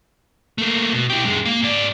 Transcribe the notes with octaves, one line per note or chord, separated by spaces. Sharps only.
A3 A#3
B2
E4 G4
F#2 G#3
A#3 F5
G#2 D5